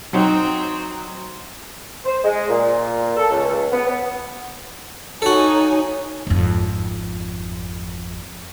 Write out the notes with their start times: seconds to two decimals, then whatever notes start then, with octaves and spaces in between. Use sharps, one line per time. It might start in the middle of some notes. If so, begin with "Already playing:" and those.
0.13 F#3 C4 D#4 F#4
2.05 C5
2.24 G#3
2.49 A#2
3.17 A4
3.30 C#2
3.72 B3
3.87 B3
5.22 D#4 F#4 A4 C#5 G#5
6.27 G#1 F2